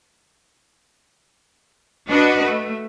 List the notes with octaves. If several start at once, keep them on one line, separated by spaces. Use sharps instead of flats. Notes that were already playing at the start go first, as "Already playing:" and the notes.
D4 F#4 B4 D#5
A3